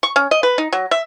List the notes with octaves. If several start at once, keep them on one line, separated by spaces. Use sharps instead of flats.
C#6
C#4
D#5
B4
D#4
F#3
E5